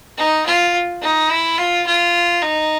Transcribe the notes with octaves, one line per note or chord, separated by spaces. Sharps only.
D#4
F4
D#4
E4
F4
F4
D#4